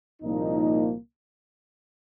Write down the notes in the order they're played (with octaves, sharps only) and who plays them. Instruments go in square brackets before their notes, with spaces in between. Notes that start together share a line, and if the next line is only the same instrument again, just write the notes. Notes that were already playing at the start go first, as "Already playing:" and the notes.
[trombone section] C2 A#2 F3 A#3 D#4